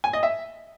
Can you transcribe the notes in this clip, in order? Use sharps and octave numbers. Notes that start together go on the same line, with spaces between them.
G#5
D#5
E5